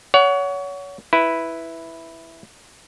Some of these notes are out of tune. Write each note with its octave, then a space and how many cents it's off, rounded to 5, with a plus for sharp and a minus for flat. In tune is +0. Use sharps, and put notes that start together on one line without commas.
C#5 +30 F#5 +0
E4 +0 B4 +0